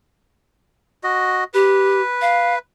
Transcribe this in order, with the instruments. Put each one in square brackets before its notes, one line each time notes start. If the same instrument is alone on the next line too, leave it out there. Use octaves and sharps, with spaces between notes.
[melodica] F#4 D#5
[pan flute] G4 [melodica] B4
[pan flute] F5